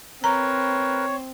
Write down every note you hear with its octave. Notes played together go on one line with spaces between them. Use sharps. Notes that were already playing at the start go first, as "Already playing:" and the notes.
C4 A#4 B4 C#5 A#5